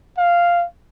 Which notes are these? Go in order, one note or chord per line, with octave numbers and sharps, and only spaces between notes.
F5